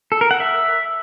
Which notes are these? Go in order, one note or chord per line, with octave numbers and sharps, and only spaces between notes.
A4
A#4
F#5
E5